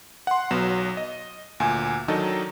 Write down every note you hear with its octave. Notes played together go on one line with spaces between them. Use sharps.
F#5 C6
B1 F#3 B3 E7
D#5
D2 A#2 G#5
D#3 F#3 D4 D#4 A4 D#5